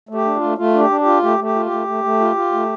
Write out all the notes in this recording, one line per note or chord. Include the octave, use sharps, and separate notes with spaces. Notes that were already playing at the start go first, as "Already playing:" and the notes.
A3
G4
D4
F4
A3
A3 F4
D4
G4
D4
F4 G4
A3 G4
A3 G4
F4
G4
A3
A3
A3
F4
F4
A3